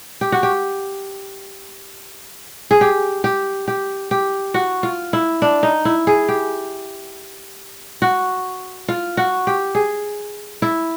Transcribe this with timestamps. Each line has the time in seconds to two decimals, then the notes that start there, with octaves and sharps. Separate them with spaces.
0.21 G4
0.32 F#4
0.43 G4
2.71 G#4
2.81 G4
3.24 G4
3.68 G4
4.11 G4
4.54 F#4
4.83 F4
5.13 E4
5.42 D4
5.63 D#4
5.85 E4
6.07 G#4
6.29 G4
8.02 F#4
8.88 F4
9.17 F#4
9.47 G4
9.75 G#4
10.62 E4